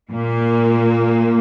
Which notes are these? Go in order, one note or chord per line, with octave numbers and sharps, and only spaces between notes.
A#2 A#3